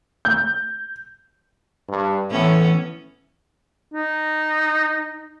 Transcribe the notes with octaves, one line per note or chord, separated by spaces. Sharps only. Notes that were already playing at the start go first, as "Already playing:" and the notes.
G6
G2
A2 E3 B3 C#4
D#4